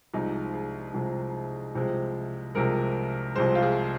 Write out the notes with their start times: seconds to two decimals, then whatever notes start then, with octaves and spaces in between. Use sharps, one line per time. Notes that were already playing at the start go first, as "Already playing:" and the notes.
0.14 C2 C3 F3 G#3 D#4
0.54 G#4
0.94 C2 C3 F3 G#3
1.75 C2 C3 F3 G#3
2.55 C2 C3 F3 G#3 A#4
3.35 C2 C3 F3 G#3 C5
3.55 F4
3.62 G#4